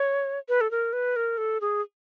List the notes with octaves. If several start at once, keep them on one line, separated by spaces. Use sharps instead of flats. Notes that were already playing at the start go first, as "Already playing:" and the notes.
Already playing: C#5
B4
A4
A#4
B4
A#4
A4
G#4